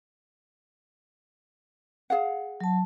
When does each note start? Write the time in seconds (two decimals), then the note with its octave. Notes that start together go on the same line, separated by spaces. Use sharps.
2.10 G#4 F5 F#5
2.61 F#3 A5